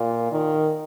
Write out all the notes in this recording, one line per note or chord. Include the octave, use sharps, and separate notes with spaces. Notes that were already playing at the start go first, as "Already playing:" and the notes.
Already playing: A#2
D#3